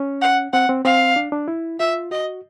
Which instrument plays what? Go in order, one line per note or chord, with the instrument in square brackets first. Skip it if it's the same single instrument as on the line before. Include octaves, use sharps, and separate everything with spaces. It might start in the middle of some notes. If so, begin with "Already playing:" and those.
Already playing: [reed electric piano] C#4
[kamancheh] F#5
[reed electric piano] C4 [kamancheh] F#5
[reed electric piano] C4
[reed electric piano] C4 [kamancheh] F5
[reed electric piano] D4
D4
E4
[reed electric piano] F4 [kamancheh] E5
[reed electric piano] F#4 [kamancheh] D#5